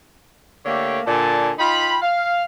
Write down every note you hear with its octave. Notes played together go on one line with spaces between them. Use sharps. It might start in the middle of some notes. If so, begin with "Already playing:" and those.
D3 A3 A#3 G4 C#5 D5
A#2 D3 D5 G#5 A5
D#4 F4 G5 B5
F5